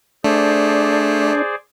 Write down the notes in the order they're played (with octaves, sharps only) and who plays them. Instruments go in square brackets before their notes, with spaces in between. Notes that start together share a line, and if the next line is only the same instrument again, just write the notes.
[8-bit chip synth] A3 [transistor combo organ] D4 [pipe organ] G#4 C5 D5